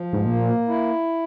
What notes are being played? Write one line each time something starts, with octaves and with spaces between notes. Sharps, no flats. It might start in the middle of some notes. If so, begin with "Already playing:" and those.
Already playing: F3
G#2
A#2 A#3
E4